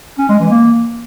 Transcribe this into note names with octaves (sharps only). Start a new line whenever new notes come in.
C#4
G#3
E3
A#3